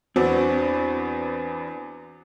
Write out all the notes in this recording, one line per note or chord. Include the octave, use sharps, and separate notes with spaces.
E2 B3 C4 D4 F#4